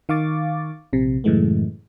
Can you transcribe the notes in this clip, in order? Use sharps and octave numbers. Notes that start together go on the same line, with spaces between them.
D#3 F5 C#6 D6 A6
A#1 C3
F#2 A2 C#3 E3 G#3 A3